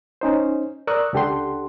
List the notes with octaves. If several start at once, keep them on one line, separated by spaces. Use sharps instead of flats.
C#4 D#4 C5
A#4 D5 C#6 D#6 E6 F#6
C#2 D4 G4 A4 F#5 C6